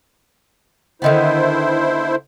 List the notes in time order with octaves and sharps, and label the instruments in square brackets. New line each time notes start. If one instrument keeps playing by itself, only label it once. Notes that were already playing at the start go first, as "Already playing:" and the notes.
[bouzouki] D3 D#3 B3 [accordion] E4 C5